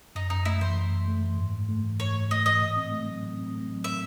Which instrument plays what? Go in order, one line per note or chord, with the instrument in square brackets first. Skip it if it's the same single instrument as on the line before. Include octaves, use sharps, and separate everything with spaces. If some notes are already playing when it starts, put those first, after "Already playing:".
[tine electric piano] F#2 [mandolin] D#4
[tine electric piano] F#2 [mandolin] D#4
[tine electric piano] A3 [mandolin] E4
[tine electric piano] E3 [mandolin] C5
[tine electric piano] F#2
F#2
A3
E3
G#2
G#2
A3
E3
[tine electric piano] G#2 [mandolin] C#5
[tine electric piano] G#2
[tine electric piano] A3 [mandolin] D#5
[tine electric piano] E3 [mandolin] D#5
[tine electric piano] A2
C4
A3
F#3
A2
C4
A3
F#3
[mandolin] E5